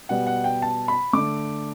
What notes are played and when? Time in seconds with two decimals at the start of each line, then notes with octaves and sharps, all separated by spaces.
0.09 B2 G3 B3 F#5
0.27 F#5
0.44 G5
0.62 A5
0.88 B5
1.13 D3 A3 D6